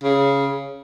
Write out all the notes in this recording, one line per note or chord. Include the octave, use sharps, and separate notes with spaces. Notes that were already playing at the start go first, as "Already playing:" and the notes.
C#3